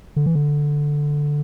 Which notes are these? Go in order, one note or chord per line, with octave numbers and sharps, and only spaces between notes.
D3
E3
D3